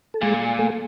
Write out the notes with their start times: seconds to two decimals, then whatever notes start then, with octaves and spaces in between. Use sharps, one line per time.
0.14 A4
0.21 A#2 G#3 G#4
0.59 A3 A4